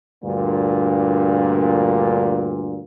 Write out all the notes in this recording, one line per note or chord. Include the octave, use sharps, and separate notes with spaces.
D2 G2 A#2